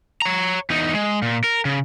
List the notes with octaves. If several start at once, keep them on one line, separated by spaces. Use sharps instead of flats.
C#5 A#5
E2 D#4
G#3
A#2
A#4
C#3